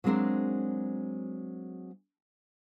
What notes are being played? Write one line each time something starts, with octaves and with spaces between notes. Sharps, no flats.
F#3 G#3 A#3 C4 D4 A#4